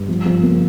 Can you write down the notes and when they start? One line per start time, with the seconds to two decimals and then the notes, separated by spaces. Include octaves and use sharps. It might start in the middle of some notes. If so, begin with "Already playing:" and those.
Already playing: G2
0.08 F3
0.26 F3
0.43 A#3